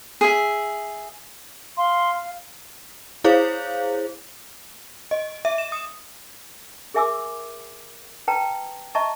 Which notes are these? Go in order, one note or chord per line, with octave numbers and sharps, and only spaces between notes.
G#4 E5
F5 C6
E4 G#4 C5 C#5 F5
D#5
E5
E7
D#6
G#4 A#4 E5 G#5 D6 E6
B4 G5 A5 A#5
D#5 E5 A5 A#5 C#6